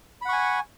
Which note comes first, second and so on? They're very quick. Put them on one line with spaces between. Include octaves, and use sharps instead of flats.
B5 F#5 C#6 G#5